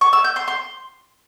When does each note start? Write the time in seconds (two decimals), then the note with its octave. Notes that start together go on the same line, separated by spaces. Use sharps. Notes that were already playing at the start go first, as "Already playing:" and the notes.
0.01 C#6
0.13 E6
0.24 G6
0.36 C6
0.48 C6